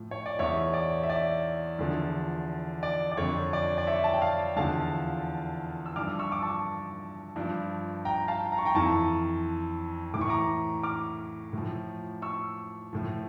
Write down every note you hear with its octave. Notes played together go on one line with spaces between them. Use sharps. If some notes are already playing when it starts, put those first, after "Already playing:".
Already playing: A2 F3
C#5
D5
E2 E3 C#5 E5
D5
E5
D5
E2 D3 F3
D5
D5
F2 D3 F3 C#5
D5
D5
C#5 E5
A5
G5
D5 F5
E2 D3 F3 F5 A5
E6
G2 F3 D6 F6
C#6 E6
D6
A5 C#6
G2 F3
G5 A#5
F5 A5
A#5
C#6
G5 A#5
F2 E3 A5 C#6
A2 E3 C#6 D6
A#5 D6
D6 F6
A2 F3
C#6 E6
A2 F3